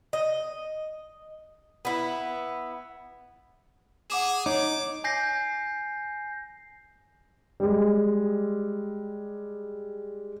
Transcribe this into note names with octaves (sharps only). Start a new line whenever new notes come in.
D#5
B3 E4
G#4 F#5 D6 E7
D#4 C#5 D6
G#5 G6 A#6 C7
G3 G#3